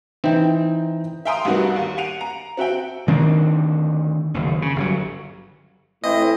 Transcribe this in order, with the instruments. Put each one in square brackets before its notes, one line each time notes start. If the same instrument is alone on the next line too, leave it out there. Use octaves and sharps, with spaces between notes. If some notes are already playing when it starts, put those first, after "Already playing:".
[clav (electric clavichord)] E3 C4 [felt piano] D#4 G5
[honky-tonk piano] E5 F5 G5 A#5 C6 D#6
C2 G2 B3 D#4 F#4 A#4
D#2
F#5 C7 D7 D#7 F7
A#5
C4 F#4 E5 G5
[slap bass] D2 D#3 C4 D4
F#1 D#2
C#3
G1 D3 F#3
[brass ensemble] A2 [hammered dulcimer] E3 C4 [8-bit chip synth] D#5